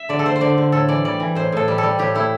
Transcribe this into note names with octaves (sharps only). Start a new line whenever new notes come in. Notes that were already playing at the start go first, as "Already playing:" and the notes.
Already playing: E5
D3 D5
A4
A3 C5
C5
D3 D5
D3
A2 A4
E3 D5
G3 D5
E3
A2 C5
A2 A4
G3
A4
G3
A2 G4
A3 E4